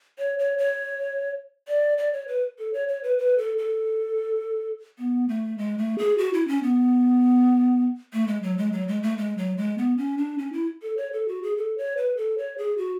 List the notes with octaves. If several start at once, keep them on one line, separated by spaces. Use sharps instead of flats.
C#5
C#5
C#5
D5
D5
C#5
B4
A4
C#5
C#5
B4
B4
A4
A4
B3
A3
G#3
A3
G#4
F#4
E4
C#4
B3
A3
G#3
F#3
G#3
F#3
G#3
A3
G#3
F#3
G#3
B3
C#4
D4
C#4
E4
A4
C#5
A4
F#4
G#4
A4
C#5
B4
A4
C#5
G#4
F#4